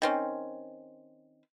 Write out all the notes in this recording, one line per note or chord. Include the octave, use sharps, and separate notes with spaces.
D#3 C4 C#4